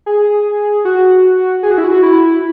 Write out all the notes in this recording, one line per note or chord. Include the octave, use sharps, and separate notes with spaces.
G#4
F#4
G#4
F#4
E4
F#4
E4